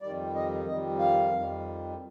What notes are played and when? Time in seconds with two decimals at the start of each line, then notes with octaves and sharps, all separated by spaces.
0.02 F2 D#3 G3 D5
0.35 D#5
0.67 F2 D#3 G3 D#5
0.99 F5
1.32 F2 D#3 G3